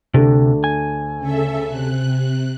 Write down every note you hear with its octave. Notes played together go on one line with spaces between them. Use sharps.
D2 C3 A3 D4
G#5
C#3 A4 E5
C3 F#6